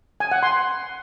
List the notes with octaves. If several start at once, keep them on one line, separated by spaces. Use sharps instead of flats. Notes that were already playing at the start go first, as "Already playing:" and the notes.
G#5
F#5
C6